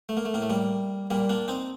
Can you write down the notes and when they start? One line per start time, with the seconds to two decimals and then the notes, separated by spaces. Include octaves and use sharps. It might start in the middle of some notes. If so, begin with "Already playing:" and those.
0.09 A3
0.17 A#3
0.25 A3
0.34 A2 A#3
0.42 A3
0.50 G3 A#3
1.10 A#2 G3 A#3
1.29 A#3 D4
1.48 C4 D#4